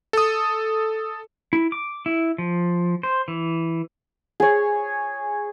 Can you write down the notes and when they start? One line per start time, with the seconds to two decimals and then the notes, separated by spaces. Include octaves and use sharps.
0.13 A4 D#6
1.53 E4
1.72 D6
2.06 E4
2.38 F3
3.03 C5
3.28 E3
4.40 G#4 C#5